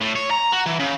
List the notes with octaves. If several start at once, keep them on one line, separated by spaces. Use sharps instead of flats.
A2
C#5
A#5
F#4
E3
C#3